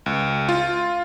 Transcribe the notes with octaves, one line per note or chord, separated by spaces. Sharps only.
C#2
F4